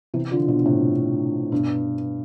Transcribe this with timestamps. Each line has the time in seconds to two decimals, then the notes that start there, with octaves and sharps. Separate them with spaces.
0.14 C3 E3
0.31 D3 F3
0.48 B2 D3
0.66 A2 C3
1.52 G2 B2